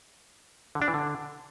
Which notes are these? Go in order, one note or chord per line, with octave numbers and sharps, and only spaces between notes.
D3
D4
E3
D3